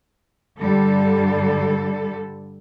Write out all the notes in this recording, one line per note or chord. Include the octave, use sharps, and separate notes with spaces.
G2 D3 G3 A4